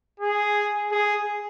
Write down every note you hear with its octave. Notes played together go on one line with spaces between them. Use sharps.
G#4
G#4